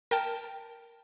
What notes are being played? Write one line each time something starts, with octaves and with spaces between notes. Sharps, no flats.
A#4 G5 A5